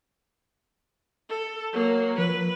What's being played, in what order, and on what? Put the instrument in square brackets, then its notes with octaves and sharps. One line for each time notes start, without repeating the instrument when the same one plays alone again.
[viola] A4
F#3 A#3
[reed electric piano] F3 [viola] B4